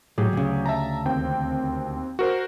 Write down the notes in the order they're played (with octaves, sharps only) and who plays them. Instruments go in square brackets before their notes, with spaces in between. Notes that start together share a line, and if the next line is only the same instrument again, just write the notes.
[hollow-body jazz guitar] A2 [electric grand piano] F#3 G4 G#4
[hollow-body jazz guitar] D2 C#3
[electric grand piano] E5 A5 A#5
D#2 C4 G5
F#4 A#4 C5